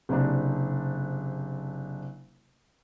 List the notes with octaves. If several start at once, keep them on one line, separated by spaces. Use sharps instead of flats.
F#1 C3 D4